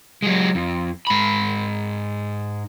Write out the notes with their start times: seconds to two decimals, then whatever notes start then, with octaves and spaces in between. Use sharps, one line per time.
0.22 F#3 G#3
0.55 F2
1.07 G#2 B5